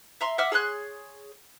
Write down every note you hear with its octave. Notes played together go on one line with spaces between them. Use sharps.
E5 A#5 C6
E5 F#5 D6 F6
G#4 C#5 C6 F#6